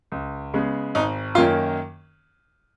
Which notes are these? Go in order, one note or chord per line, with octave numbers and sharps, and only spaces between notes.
C#2
C#3 G#3 B3
G#1 D#4
F#2 D#3 A#3 C#4 F4